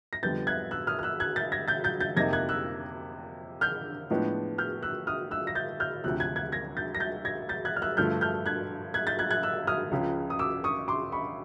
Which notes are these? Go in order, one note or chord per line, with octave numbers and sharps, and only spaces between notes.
A#6
F2 D3 G3 B3 G6 A6
F#6 G#6
E6 F#6
D#6 F6
F6
E6 F#6
F#6 G#6
G6 A6
G#6 A#6
G6 A6
G6 A6
G6 A6
F2 C3 F3 A#3 D#4 G#6 A#6
F#6 G#6
E6 F#6
F6 G6
A2 F3 G#3 B3 D4
F6 G6
E6 F#6
D#6 F6
E6 F#6
A#6
G6 A6
F6 G6
D2 C3 F3 E6 F#6
F#6 G#6
F#6 G#6
G#6 A#6
G6 A6
A#6
G6 A6
G#6 A#6
G6 A6
F#6 G#6
F6
E6 F#6
G2 D3 F3 A3 D4 F6 G6
F6 G6
F#6 G#6
F#6 G#6
G6 A6
F#6 G#6
F#6 G#6
E6 F#6
D#6 F6
C#2 C#3 F3
D#6
D6 E6
C#6 D#6
C6 D6
B5 C#6